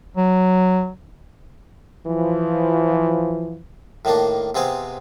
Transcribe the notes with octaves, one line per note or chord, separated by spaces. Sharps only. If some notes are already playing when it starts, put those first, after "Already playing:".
F#3
E3 F3
A2 D#3 A#3 D4
C3 B3 C4 G#4 F5